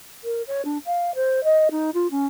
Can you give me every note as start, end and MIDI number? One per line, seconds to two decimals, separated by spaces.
0.24 0.42 70
0.47 0.64 73
0.65 0.78 62
0.86 1.14 77
1.15 1.43 72
1.44 1.68 75
1.71 1.90 63
1.94 2.07 65
2.11 2.26 61